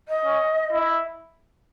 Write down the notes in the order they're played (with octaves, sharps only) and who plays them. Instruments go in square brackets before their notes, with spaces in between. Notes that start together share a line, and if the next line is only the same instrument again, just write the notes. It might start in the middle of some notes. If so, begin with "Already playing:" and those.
[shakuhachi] D#5
[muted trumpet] C#4
E4